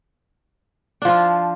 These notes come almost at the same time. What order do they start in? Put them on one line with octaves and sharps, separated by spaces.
D4 F3 F4